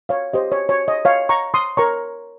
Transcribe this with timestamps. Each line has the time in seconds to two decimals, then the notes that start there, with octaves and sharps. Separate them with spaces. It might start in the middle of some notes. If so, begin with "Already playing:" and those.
0.09 C#5 F5
0.33 G4 C5 D#5
0.52 C#5
0.69 C#5
0.88 D#5
1.05 C#5 F5
1.29 A#5 C#6
1.54 C6 D#6
1.77 A#4 C#5 A#5 C#6